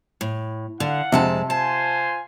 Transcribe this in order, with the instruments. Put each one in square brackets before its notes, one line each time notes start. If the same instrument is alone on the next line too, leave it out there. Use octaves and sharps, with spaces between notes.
[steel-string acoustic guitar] A2
[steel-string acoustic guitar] D3 [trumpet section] F5 F#5
[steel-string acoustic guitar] F2 G#3 A5 [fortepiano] C3
[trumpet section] F4 C5 G#5 [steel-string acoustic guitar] A5